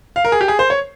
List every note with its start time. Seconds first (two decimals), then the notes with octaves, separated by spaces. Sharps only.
0.16 F5
0.25 A#4
0.32 G#4
0.41 G4
0.48 G#4
0.59 C5
0.70 C#5